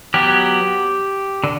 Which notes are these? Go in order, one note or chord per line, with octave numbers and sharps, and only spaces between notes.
F#3 B3 G4
D3